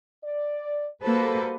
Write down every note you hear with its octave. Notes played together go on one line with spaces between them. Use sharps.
D5
G3 A#3 F#4 A4 B4 C5